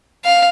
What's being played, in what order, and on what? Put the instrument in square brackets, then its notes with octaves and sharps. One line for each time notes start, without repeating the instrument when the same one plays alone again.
[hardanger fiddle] F5